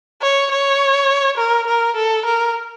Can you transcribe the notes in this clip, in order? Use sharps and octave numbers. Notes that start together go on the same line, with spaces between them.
C#5
C#5
A#4
A#4
A4
A#4